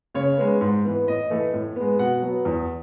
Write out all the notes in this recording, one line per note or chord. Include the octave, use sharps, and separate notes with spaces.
C#3 C#5
G#3 B3
G#2
E3 B3
A2 D#5
E3 A3
A2
G#3 B3
B2 F#5
F#3 B3
E2